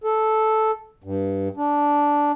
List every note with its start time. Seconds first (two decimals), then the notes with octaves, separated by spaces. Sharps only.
0.04 A4
1.04 G2
1.57 D4